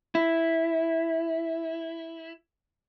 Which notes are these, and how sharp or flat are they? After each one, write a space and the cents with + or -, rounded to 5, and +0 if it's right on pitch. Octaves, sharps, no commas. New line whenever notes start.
E4 -5